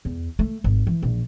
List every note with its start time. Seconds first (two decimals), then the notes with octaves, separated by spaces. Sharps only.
0.05 E2
0.39 A3
0.64 G#1
0.87 E3
1.03 A#1